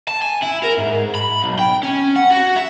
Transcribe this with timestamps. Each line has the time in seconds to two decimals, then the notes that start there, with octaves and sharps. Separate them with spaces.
0.08 A5
0.22 G#5
0.43 E4
0.64 A#4
0.78 G#2
1.15 B5
1.43 B1
1.59 G5
1.83 C#4
2.16 F#5
2.31 F#4
2.56 E5